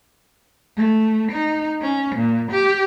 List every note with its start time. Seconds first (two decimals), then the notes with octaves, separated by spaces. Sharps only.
0.77 A3
1.31 D#4
1.81 C#4
2.15 A#2
2.51 G4